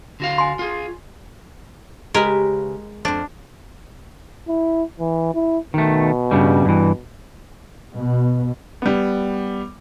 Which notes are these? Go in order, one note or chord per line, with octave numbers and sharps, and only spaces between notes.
D3 F#4 F5
G#5 C6
F4 G#4
C#3 G#3 G4 A#4 B4
F2 C4 D4
E4
E3
E4
B2 D#3 A3
G2 C#3 G3
G2 E3
B2
G3 B3